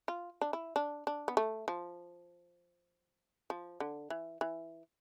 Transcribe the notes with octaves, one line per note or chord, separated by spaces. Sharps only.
F4
D4
E4
D4
D4
B3
A3
F3
F3
D3
E3
E3